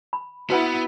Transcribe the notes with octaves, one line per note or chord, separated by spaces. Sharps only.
B5
B3 E4 F#4 B4 F#5